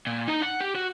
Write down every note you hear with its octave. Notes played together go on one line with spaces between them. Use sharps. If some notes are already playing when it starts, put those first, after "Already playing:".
A#2
D#4 A#5
F#5
G4
F#4